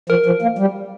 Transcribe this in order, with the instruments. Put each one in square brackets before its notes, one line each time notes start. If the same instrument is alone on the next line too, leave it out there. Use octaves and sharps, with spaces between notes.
[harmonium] F3 [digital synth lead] A#4
[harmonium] F3
A#3
G3